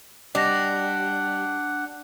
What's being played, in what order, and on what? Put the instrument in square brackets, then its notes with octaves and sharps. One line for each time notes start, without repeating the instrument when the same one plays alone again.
[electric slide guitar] G3 [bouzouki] D4 [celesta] D#5 A#6 [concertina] F#5